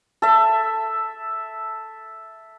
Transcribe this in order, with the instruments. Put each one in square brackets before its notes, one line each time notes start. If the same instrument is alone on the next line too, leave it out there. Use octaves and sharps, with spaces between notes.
[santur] A4 E5